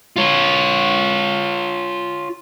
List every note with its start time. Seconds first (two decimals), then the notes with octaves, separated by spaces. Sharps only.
0.16 F4 C#5